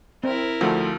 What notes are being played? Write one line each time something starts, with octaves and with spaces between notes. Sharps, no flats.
C4 E4 A#4
D2 F3 A3